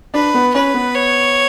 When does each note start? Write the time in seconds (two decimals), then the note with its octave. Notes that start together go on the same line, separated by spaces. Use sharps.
0.14 D4 B4
0.34 B3
0.54 C#4 B4
0.74 B3
0.95 C#5